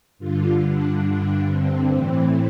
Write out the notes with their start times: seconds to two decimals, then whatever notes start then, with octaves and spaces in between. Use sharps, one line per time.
0.18 G2 D3 F4
0.63 D4
1.05 D4
1.49 C4
1.92 A2 E3